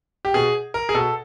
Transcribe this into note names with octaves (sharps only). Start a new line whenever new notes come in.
G4
B2 G#4
A#4
G#4
B2 A4